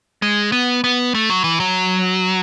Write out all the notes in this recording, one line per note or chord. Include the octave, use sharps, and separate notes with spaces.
G#3
B3
B3
A3
F#3
E3
F#3